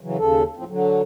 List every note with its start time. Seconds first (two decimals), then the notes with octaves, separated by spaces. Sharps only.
0.01 C#3 E3 F#3
0.18 D#2 C#3 A4
0.57 A2 F3 C4
0.68 D3 F#3